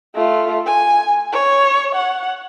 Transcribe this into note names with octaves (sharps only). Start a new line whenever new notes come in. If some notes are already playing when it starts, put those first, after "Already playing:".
A3 F4
G#5
C#5
F#5